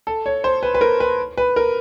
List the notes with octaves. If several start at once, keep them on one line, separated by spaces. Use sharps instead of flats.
A4
C#5
C5
B4
B4
A#4
B4
B4
A#4